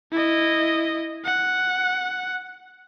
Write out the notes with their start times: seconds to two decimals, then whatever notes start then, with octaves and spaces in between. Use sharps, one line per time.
0.12 E4 D#5
1.24 F#5